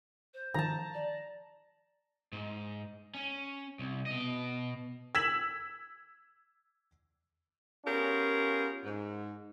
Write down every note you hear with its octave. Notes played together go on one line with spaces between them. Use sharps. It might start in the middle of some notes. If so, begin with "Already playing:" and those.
C5
G#2 D#3 F3 A5 A#5
D5
G#2
C#4
C2
B2 D#5
E6 G#6 B6 E7 F#7
B3 C#4 F4 G4 G#4 A#4
G#2